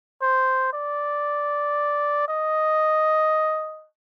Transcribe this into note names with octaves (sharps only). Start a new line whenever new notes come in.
C5
D5
D#5